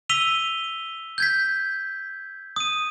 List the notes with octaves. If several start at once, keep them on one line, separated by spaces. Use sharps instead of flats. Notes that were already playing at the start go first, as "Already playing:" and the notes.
E6 B6 D#7 F7 G7
G6 G#6 B6
D#6 D#7